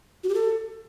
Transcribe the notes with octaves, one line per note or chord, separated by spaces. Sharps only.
F#4
G4
A4